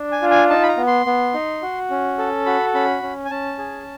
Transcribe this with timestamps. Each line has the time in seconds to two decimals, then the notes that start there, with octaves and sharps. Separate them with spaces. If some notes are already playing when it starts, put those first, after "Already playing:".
Already playing: D4
0.12 G#5
0.22 F4
0.31 G#5
0.49 D#4 A5
0.63 B5
0.69 A#5
0.77 B3
0.87 C6
1.06 B3
1.34 D#4
1.62 F#4
1.90 C#4
2.18 A4
2.46 F#4 B5
2.74 C#4 B5
3.03 C#4
3.25 G#5
3.31 C#4 A5
3.58 G#4